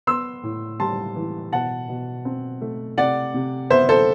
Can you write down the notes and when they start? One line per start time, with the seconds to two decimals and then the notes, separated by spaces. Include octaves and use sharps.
0.07 B3 C6 E6
0.43 A2
0.80 G3 A5 C6
1.16 E3
1.52 B2 F#5 A5
1.89 B2
2.25 C4
2.61 A3
2.98 C3 D5 F#5
3.34 C3
3.70 B3 C5 E5
3.89 A4 C5